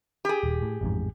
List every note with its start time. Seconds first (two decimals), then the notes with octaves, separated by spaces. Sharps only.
0.25 G4 G#4
0.43 D#1
0.62 A2
0.81 A1 F2 G#2